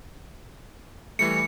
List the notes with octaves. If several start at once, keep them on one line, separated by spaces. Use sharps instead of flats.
E3 G3 A3 C#7